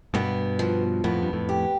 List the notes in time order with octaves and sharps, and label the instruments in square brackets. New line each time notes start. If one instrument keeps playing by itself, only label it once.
[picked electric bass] G2 B2 [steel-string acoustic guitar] B3
[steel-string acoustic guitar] F3
[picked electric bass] F2 A2 [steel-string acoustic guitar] B3
[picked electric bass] G2
F2 A2
[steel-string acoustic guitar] G4